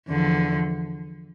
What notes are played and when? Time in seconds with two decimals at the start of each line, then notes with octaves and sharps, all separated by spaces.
0.08 E2 D3 F3